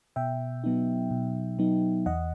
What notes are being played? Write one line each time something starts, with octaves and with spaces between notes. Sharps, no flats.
B2 E5 G5
F#3 B3 D#4
B2
F#3 B3 D#4
E2 D#5 F#5